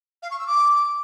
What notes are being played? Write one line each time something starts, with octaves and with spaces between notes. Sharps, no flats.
F5
C#6
E6
D6